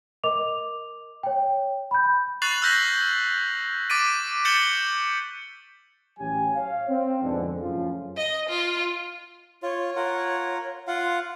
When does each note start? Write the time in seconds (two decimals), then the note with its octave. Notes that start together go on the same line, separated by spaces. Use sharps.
0.24 A#4 D#5 D6 F7
1.23 C#5 G5
1.91 B5 G6
2.42 C#6 F#6 A6 C7 F7 F#7
2.62 E6 F6 G6 A#6 B6 F#7
3.90 D6 A6 B6 D7 D#7
4.45 G6 A6 C#7 E7 F#7 G7
6.19 A1 F#3 C#4 G4 G#5
6.54 C#5 F5
6.89 C4
7.23 F2 G#2 B2 D3
7.61 F#2 A2 C#3 F3 F4
8.17 D#5
8.49 F4
9.62 F4 C#5
9.96 F4 A#4 F#5
10.87 F4 F5 F#5 C6